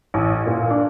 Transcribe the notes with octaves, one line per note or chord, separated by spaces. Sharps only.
A1
A#2
D4